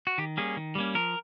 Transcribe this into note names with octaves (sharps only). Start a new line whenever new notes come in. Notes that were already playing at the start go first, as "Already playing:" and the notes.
F#4
D#3 G4
G3 A#3 C#4 G#4
D#3
G3 A#3 C#4
F3 A#4